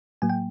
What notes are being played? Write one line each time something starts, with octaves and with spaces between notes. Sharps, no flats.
A2 F#3 A#3 G#5
G5